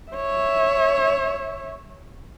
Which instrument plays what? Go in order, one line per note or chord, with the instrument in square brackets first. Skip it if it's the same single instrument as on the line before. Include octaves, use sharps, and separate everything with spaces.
[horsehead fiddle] C#5 E5